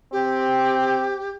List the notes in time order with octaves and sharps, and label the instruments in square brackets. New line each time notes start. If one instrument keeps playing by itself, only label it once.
[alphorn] C4 [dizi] G4